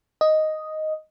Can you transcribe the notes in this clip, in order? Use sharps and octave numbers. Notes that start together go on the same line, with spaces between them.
D#5